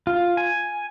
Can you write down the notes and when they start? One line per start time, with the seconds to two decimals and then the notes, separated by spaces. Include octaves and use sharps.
0.07 F4
0.37 G#5